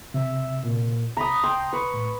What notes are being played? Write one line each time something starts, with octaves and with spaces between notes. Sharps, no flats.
C3 E5
A#2
C2 A#5 B5 D#6
G5 C6
B4 C#6
A2